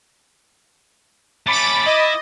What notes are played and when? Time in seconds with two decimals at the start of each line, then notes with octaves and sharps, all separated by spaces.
1.47 A3 C#4 B5 D6 A6
1.86 E4 D#5